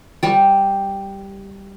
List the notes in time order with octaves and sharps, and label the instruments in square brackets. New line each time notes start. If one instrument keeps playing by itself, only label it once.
[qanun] G3 G4